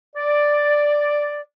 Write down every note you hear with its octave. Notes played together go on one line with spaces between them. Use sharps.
D5